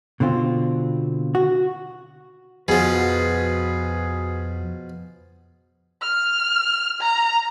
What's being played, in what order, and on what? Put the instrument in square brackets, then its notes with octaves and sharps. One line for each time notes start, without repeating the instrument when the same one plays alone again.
[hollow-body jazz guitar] B2 D3 C4 F4
F#4
[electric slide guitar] F2 F#4 [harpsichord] B2 F3 [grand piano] G#4 [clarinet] B4
[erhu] F6
A#5